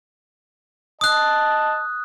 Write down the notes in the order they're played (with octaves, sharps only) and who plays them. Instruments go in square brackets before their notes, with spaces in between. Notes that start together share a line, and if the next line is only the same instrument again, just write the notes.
[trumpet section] D#5 A5 [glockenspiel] D#6 F#6